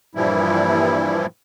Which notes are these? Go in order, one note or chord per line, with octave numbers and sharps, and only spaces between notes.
G2 A#2 E3 F3 G3 E4